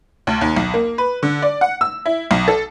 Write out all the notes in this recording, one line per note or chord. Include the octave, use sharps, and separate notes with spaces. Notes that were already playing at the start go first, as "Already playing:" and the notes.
D2
D#2
B1
A#3
B4
D3
D5
F#5
E6
E4
B1
A4